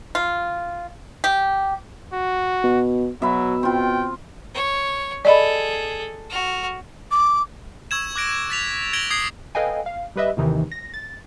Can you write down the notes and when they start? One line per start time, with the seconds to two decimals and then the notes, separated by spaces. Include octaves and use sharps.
0.15 F4
1.24 G4
2.13 F#4
2.64 B2
3.22 B2 F#3 E5 B5
3.63 C4 F4 G5
4.54 C#5
5.25 G#4 A4 D5 D#5 B5
6.30 F#4 F6
7.11 D6
7.91 C#6 E6 G#6 E7
8.16 D6 F#6 A#6 D7
8.50 A6 B6 F7
8.93 G#6 A#6 D7 F#7 G7
9.10 D#6 G#6 C7
9.55 A4 B4 D#5 F5 G5 G#5
9.86 F5
10.16 G3 G4 B4 D#5 E5
10.37 D#2 C3 D#3 E3
10.72 A#6
10.94 A6